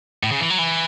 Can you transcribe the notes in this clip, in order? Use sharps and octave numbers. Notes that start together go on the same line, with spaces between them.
A2
C#3
E3
F#3
E3